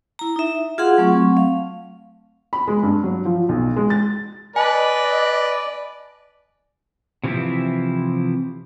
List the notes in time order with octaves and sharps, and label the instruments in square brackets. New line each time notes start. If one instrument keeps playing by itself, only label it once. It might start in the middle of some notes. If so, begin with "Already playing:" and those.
[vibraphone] E4 A#5
D#4 E5
F4 F#4 G#4 F5 F#5 C6
F#3 A3 C4 C#6
F5
[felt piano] B5
G#3
G2
F#3
F3
B1
G#3
A6
[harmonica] B4 [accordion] D5 [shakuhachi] D#5 [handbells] G#5 A5
[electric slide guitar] C3 E3 F3 B3 C4 E4